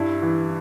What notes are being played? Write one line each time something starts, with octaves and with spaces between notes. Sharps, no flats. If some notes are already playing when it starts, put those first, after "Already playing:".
Already playing: G2 E4
E3